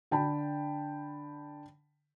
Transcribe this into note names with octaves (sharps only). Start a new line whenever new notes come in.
D3 G5 A5 B5